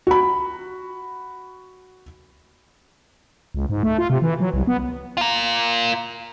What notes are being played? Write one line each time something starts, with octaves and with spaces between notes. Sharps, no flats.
F#4 B5
C#2
G#2
A3
F4
C3
E3
F#3
C2
B3
F4 A#4